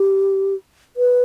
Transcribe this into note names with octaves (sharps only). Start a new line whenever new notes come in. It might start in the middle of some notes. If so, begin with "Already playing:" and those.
Already playing: G4
B4